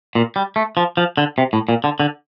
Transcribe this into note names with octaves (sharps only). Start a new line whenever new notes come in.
A#2
G3
A3
F3
F3
D3
C3
A2
A#2
D3
D3